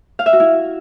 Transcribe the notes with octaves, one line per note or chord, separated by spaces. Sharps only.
F5
E5
F#4
E4